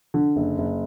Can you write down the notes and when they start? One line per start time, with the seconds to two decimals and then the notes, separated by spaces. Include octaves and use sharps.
0.14 D3
0.36 F#1
0.58 F#1